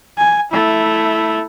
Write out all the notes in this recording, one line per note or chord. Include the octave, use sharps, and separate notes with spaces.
G#5
A3 E4